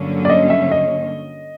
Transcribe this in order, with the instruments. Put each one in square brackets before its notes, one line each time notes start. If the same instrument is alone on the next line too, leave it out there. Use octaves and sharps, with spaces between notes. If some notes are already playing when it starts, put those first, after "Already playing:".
Already playing: [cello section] G2 D3 F#3 A#3 C#4
[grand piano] D5
D#5
E5
D#5